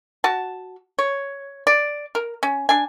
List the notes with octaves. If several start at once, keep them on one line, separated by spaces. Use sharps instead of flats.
F#4 A5
C#5
D5
A#4
C#4
D4 G#5